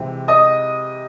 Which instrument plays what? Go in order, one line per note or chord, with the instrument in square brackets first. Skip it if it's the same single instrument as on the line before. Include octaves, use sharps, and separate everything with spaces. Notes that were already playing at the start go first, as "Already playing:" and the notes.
Already playing: [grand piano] C3 E3 G#3 C4
D#5 D#6